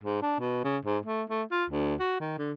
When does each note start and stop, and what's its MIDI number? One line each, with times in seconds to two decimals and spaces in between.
0.03 0.20 44
0.22 0.38 62
0.39 0.61 47
0.64 0.77 49
0.85 0.98 44
1.05 1.23 57
1.29 1.43 57
1.51 1.65 65
1.70 1.94 38
1.99 2.19 66
2.20 2.35 51
2.38 2.53 50